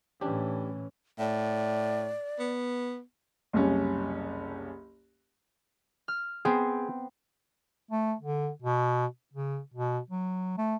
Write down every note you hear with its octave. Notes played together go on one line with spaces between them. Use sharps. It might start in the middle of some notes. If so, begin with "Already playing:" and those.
A2 E3 C#4 D4 G4
A2 D5
B3
F#1 C2 C#4
F6
B3 C4 G#4
A3
D3
B2
C#3
B2
F#3
A3